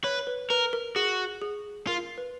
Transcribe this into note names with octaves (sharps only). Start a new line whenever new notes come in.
B4 C#5
B4
A#4 B4
A#4
F#4 G#4
G#4
F4 A#4
B4